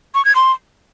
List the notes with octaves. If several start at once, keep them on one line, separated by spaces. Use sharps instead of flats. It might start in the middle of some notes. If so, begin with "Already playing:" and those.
C#6
G#6
C6